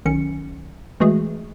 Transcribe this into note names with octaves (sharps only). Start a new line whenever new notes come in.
B1 D#3 C#4 C#7
E3 G#3 A3 F#4 G#4